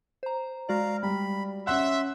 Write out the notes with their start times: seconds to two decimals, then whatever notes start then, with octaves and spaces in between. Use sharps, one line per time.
0.23 C5 A#5
0.69 G#3 F#4 D5 F5 A#5
1.03 G3 B5
1.67 C#4 E5 F#5 C6 F#6